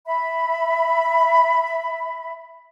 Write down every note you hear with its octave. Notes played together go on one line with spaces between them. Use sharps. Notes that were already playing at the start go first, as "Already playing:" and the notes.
E5 B5